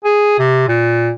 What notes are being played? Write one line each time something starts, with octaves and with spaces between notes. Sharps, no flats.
G#4
C3
A#2